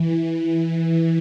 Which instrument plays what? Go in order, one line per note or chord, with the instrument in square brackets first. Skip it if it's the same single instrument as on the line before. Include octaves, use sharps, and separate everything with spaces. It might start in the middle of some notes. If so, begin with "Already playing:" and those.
Already playing: [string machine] E3